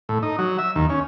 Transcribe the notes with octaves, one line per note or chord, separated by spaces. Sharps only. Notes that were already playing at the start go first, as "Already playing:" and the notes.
A2
D#4
F#3
E5
D#2
C#4